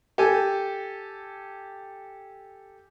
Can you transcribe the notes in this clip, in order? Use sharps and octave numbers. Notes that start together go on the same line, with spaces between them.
G4 A4 G#5